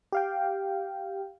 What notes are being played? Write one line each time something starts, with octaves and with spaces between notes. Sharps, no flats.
G4 F5 G5